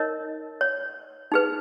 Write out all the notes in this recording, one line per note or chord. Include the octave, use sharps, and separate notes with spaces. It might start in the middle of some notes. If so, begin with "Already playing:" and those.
Already playing: D#4 A#4 C#5 D#5
C#5
D#4 G#4 B4